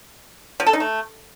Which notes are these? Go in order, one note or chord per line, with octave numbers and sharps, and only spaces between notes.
F3
A4
D#4
A3